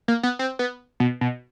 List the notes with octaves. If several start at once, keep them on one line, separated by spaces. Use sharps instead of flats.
A#3
B3
C4
B3
B2
B2